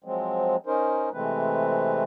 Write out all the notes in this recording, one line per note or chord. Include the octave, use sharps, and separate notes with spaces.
F3 F#3 G#3 C4
C#4 D#4 A#4 C5
C3 E3 G#3 A3 C4 B4